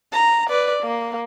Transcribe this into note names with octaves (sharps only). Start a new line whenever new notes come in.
A#5
B4 D5
A#3